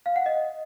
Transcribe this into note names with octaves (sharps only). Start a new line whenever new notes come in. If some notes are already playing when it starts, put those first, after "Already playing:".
F5
F#5
D#5